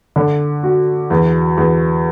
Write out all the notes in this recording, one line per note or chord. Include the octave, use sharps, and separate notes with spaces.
D3
F#4
E2
E2